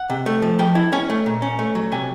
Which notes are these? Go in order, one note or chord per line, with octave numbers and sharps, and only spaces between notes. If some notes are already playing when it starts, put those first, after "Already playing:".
Already playing: F#5
C3
A3
F3
F3 G5
E4
C#4 G#5
A3
A#2
C#4
A3
F#3
C3 G#5